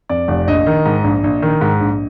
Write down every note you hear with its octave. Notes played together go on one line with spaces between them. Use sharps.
F2 D5
F1
A#1 D#5
D#3
G#2
A#1
A#1
D#3
G#2
A#1